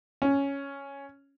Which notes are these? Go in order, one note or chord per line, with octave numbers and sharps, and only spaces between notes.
C#4